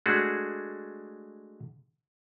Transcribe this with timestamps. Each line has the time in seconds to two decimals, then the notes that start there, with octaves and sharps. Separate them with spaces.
0.06 G#3 A3 D4 F#4 G#4